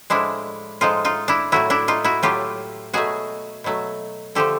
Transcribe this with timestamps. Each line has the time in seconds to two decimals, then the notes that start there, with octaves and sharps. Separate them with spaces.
0.10 A2 F3 G#3 D4 E4
0.81 A2 F3 G#3 D#4 F4
1.05 D#4 F4
1.28 D4 E4
1.52 A2 F#3 A3 E4 F#4
1.70 D4 E4
1.88 D#4 F4
2.04 E4 F#4
2.23 A2 F#3 A3 F4 G4
2.93 B2 F#3 A3 F#4 G#4
3.64 B2 F#3 A3
4.35 D3 F3 A3 G4 A4